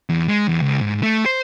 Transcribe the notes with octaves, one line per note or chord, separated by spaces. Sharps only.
E2
G#3
E2
C#2
G#2
A3
C5